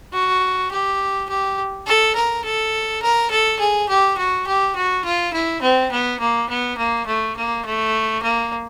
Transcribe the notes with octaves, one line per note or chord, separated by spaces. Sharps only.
F#4
G4
G4
A4
A#4
A4
A#4
A4
G#4
G4
F#4
G4
F#4
F4
E4
C4
B3
A#3
B3
A#3
A3
A#3
A3
A#3